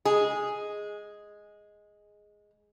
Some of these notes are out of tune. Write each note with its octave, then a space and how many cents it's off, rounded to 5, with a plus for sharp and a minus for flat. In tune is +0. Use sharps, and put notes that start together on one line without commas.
G#3 +0 G#4 +0